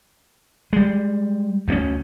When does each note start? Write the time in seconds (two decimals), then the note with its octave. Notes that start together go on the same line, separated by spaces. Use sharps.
0.73 G3 G#3
1.68 D2 A3 C#4